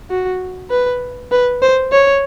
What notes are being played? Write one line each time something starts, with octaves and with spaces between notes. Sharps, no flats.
F#4
B4
B4
C5
C#5